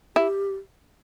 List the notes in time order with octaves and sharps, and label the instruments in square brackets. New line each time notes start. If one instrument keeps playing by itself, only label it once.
[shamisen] E4 [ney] G4